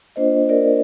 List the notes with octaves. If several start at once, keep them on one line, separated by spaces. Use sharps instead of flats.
A#3 D4 F4 C5 D#5
A#4 D5